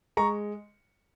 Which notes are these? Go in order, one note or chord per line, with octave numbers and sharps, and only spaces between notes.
G#3 A#5 C#6